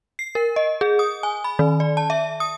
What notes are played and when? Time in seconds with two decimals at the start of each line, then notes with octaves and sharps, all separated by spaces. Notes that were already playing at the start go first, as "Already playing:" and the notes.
0.19 C7
0.35 A#4
0.56 D#5
0.81 G#4
0.99 D#6
1.23 G#5
1.44 B5
1.59 D#3
1.80 D5
1.97 A5
2.10 E5
2.40 D#6